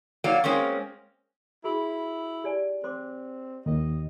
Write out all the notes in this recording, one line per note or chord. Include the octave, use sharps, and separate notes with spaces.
F#3 A#3 D5 F5
G#3 A#3 C4 C#4
E4 F#4 G#4 B5
G4 D5 G#5
C4 C5 C6 D6
D#2 D#3 D#5